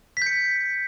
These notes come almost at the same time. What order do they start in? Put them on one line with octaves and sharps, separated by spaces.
B6 G6 C#7